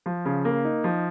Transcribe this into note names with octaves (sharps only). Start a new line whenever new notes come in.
F3
C#3
A#3
D#4
F3